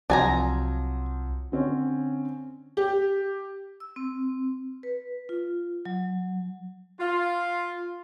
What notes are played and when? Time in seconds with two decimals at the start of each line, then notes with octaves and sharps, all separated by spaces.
0.10 C2 F3 F#3 C4 D4 G#5 A#5
1.52 D3 C4 C#4
2.77 G4
3.80 E6
3.96 C4
4.83 B4
5.29 F4
5.85 F#3
7.00 F4